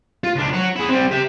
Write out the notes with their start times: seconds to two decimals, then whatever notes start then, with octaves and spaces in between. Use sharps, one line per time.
0.24 F4
0.36 C#2 D4
0.54 F#4 C#5
0.76 E4 G#4
0.89 G3 C4
1.11 G4 E5